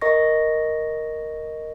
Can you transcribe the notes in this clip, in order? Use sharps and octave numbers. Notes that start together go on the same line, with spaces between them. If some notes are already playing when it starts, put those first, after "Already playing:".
A#4 D#5 C#6 A#6